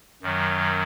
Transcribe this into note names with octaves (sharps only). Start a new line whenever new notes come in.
F#2 D#3 F#3